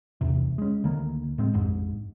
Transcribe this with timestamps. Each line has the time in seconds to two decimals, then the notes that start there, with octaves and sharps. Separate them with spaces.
0.21 B1 E2 C3
0.58 G#3 C#4
0.84 D2 D#3 A#3
1.38 A2 G#3 C4
1.53 A#1 F2 G#2